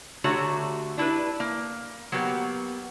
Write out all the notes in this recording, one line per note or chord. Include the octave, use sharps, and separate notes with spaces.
D3 A3 F#4 G4 C#5 A#5
D4 E4 G4 B4
A#3
F#3 A#3 B3 G4